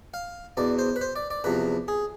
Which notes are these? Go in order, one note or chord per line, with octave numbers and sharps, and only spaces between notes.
F5
E2 B2 D5
C5
B4
C5
D5
D5
E2 C3 F3 B4
G#4